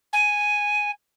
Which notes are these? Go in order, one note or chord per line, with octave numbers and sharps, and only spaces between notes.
G#5